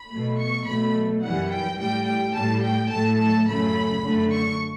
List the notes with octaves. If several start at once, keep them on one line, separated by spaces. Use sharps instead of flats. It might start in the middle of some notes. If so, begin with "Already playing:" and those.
Already playing: B5
B2 F#3 A3
C#6
B2 F#3 A3 B5
F#2 E3 G3 F#5
G5
A2 G3 G5
G5
A2 G3 A5
G5
A2 F#3 A3 A5
A5
F#2 C#3 F#3 A3 B5
F#2 D3 A3
C#6